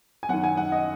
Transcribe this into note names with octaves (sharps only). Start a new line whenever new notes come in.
G#5
F#2 D#3 F#5
G#5
F#5
D#5